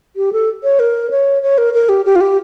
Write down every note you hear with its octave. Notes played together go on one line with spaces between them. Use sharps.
G4
A4
C#5
A#4
C#5
C#5
A#4
A#4
G4
G4
F4
G4